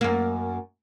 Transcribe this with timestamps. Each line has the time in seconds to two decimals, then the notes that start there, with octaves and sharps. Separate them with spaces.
0.01 F#2 A#3